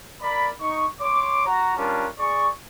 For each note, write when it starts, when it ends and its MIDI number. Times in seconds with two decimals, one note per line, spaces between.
0.22 0.49 70
0.22 0.49 74
0.22 0.49 83
0.61 0.86 63
0.61 0.86 85
1.01 1.44 73
1.01 1.44 84
1.01 1.44 86
1.46 1.73 66
1.46 1.73 82
1.77 2.07 55
1.77 2.07 61
1.77 2.07 62
1.77 2.07 65
1.77 2.07 70
2.19 2.50 68
2.19 2.50 74
2.19 2.50 85